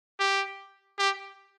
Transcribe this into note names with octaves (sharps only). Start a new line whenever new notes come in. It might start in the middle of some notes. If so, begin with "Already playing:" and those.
G4
G4